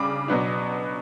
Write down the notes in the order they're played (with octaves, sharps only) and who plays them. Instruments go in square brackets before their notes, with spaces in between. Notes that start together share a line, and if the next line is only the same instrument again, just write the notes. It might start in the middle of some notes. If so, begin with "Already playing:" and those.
Already playing: [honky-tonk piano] C#3 G3 D4 B5 D6
B2 F#3 B3 D4